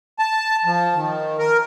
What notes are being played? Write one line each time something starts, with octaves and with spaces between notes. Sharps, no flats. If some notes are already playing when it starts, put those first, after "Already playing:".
A5
F3
D#3
A#4